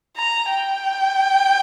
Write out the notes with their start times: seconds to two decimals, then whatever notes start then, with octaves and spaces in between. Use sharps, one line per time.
0.17 A#5
0.49 G5